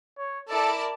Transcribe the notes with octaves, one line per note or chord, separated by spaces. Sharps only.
C#5
E4 A4 A#4 D5 A5